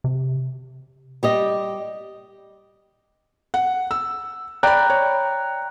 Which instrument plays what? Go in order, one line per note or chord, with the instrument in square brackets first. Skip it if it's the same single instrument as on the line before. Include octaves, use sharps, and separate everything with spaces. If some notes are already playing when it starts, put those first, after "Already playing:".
[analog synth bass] C3
[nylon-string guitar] G3 G4 D#5
[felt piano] F#5
E6
[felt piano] D5 B5 [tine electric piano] G5 A#5 F#6
[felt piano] C#5